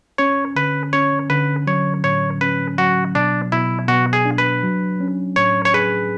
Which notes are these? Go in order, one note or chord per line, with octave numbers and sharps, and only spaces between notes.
C#4 C#5
D3 B4
C#4 C#5
D3 B4
F#3 C#5
A2 C#5
C#4 B4
F#3 F#4
B2 D4
B2 E4
B2 F#4
G#4
D4
B4
F#3
C#4
A2 C#5
C#5
G#4 B4